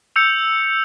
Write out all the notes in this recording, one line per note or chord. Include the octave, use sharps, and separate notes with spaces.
E6 G6 C#7 F7